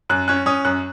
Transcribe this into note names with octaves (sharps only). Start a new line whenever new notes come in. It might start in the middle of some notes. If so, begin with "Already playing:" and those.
F#2 F#6
C#4 F#6
C#4 D#6
F#2 F#6